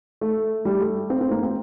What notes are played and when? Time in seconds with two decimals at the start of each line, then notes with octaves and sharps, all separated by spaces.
0.21 A3
0.65 G3
0.80 A3
1.10 C4
1.21 C4
1.31 A#3
1.43 C4